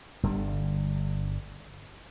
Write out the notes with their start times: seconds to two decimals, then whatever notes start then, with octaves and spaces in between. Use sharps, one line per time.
0.23 G1 D3 G3